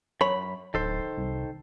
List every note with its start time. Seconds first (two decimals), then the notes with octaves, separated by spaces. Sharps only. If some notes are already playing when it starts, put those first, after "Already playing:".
0.21 F#2 C#5 B5
0.74 D1 D#3 A4 C5
1.17 C2